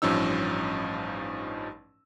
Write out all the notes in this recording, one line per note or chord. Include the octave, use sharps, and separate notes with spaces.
A1 G2 F3 C#4 D#4 E6